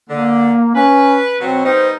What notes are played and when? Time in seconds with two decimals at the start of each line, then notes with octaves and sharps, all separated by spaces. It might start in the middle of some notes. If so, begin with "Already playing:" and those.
0.09 D3 A#3
0.75 C#4 B4
1.40 B2 F#3 C4
1.65 G3 B3 D#4 C5